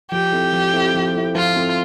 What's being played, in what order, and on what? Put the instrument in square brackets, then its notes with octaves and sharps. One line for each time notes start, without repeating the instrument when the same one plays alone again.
[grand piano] F3 [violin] G4
[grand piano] C4 E4 A4
F3
C4 E4 A4
F3
C4 E4 A4
[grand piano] F3 [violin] F4
[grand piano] C4 E4 A4